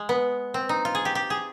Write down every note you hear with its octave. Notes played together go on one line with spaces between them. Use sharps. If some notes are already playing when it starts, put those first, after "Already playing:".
Already playing: G#3
B3
C4
D#4
F4
G#4
G4
G4
G#4